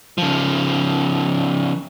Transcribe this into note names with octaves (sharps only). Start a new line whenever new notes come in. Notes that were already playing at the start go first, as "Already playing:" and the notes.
C#3 F3